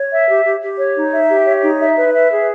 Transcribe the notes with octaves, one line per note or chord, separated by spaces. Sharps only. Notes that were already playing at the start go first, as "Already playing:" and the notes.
Already playing: C#5
E5
G4
G4
G4
C#5
D#4
E5
G4
C#5
D#4
E5
B4
E5
G#4